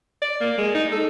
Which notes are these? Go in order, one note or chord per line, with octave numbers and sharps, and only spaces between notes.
D5
A#3
G#3
D#4
A4